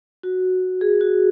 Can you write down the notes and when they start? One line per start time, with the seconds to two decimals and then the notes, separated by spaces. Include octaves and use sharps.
0.23 F#4
0.81 G#4
1.01 F#4